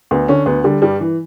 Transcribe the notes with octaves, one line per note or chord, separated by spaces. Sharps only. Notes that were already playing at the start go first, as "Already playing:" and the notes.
D2 B3
D3 C#4
D2 B3
D3 G3
G2 G3
E3